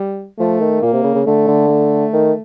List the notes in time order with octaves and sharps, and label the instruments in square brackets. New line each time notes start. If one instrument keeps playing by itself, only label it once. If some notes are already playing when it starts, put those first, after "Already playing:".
Already playing: [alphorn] G3
[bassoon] F3 [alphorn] A3
[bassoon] D#3
[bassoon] A#2 [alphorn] A#3
[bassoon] C3
C#3
C#3
[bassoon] D3 [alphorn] A3
[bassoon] D3
[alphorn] A3
[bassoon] D#3